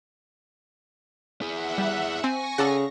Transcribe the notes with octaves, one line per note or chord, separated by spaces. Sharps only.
E4 G#4 E5 F#5
G3
C4 G#5 C#6 A#6
C#3 A4 D5 F#5